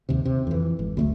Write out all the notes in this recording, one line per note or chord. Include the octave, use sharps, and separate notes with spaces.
D#2 C3
C3
F2 E3
G#1
D2 G#3 A3